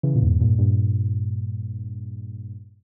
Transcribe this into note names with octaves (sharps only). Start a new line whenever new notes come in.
C#3 E3
A#2
E2 G#2
G2 A#2
G2 A#2